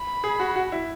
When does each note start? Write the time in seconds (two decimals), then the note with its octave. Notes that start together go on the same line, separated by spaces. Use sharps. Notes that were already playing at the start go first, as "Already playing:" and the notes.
Already playing: B5
0.24 G#4
0.40 F#4
0.56 F#4
0.72 E4